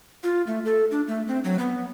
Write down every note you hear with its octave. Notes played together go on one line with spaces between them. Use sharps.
F4
A3
A4
D4
A3
C4
F#3
B3